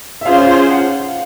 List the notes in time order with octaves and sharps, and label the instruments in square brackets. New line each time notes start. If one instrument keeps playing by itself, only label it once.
[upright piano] E5
[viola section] C#4 F4 G#4 C5 [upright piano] F5
[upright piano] F#5